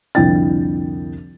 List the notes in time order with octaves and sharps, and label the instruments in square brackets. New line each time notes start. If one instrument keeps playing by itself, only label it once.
[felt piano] C2 F2 D3 E4 G5 A6